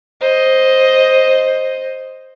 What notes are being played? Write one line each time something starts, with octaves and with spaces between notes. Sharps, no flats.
C5 D#5